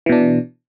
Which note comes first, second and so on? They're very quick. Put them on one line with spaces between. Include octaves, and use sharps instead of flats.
E3 B2 D4